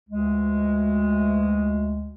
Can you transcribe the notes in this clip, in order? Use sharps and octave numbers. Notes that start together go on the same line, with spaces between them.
D2 G#3